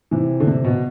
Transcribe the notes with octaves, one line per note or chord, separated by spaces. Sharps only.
C3 E3
D3
C3
B2